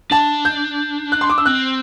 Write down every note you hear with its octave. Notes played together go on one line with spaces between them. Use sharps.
D4 A5
G6
F#6
C6
D6
E6
C4 F#6